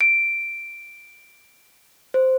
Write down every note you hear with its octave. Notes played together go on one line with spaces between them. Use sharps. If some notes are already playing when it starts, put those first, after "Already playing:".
D7
C5